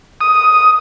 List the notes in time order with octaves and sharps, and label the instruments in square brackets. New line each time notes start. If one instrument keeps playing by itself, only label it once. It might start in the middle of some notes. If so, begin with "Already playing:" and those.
[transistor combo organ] D#6